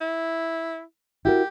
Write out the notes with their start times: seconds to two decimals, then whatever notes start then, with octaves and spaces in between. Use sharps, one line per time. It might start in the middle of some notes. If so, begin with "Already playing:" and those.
0.01 E4
1.25 E4 F#4 G4 A#4